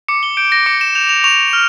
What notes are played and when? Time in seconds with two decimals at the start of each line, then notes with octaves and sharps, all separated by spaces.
0.08 D6 C#7
0.23 G7
0.37 G6 D7
0.52 A#6
0.66 D6 C#7
0.81 E7
0.95 G6 F7
1.09 F7
1.24 C#6 F7
1.53 F6